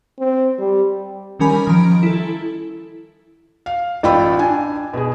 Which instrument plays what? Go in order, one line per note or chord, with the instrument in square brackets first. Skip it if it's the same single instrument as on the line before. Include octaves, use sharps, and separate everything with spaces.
[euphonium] C4
G3
[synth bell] D#3 G3 C#4 A#4 G#5 B5
D#3 F3 A#5 D7
E4 A4
[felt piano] F5
A1 F4 D5 G5 B5 E6
D4 G#5
B2 G#4